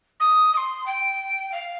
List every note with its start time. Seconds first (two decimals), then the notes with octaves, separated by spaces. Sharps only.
0.19 D#6
0.52 D#6
0.56 C6
0.86 G5
1.51 F5